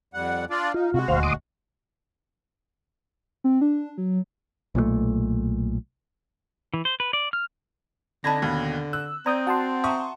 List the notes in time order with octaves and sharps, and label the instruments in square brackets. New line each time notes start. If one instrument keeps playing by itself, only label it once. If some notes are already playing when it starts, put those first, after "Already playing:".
[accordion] F2 G3 F#5
D4 F4 D5
[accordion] D#4 [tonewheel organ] F4
[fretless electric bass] C3 [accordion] G#3 F#4
[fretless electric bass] D#1 D2 [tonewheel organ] C5 F5
[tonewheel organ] C6 D6 D#6
[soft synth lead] C4
D4
F#3
[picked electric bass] B1 A#2 D#3 A3
[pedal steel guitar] E3
C5
B4
D5
F6
[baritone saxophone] D3 [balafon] C4 A5 [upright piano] D4 D#4 [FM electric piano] B5 G#6 A#6
[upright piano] D#2 B2
[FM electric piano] E6 [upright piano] F#6
[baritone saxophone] C4 [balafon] D5 [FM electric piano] A#5 D#6 G6
[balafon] F#4 [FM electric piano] F#5 A5 C6
[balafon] E5 A#5 [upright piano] C#6 D#6